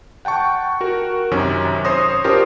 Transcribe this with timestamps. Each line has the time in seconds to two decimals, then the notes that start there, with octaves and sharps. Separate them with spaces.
0.25 F#5 G5 A5 C#6
0.81 F#4 A#4
1.31 F#2 C3 D#3 C#4
1.85 C5 C#5 C6 D#6 A#6
2.24 C#4 D4 F4 G4 A#4 C5